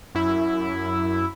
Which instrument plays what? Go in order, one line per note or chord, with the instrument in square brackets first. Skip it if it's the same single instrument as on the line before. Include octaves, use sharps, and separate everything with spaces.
[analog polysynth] F#2 E4